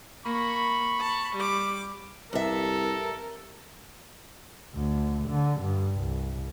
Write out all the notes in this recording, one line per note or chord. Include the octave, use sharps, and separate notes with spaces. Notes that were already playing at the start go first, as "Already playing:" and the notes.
A#3 B5 C#6
A5
G3 D6
C2 G2 A4 A#4 E5
D2
D3
G2
C2